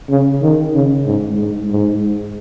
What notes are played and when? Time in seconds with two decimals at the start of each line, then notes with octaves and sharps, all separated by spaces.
0.10 C#3
0.42 D#3
0.74 C#3
1.06 G#2
1.38 G#2
1.71 G#2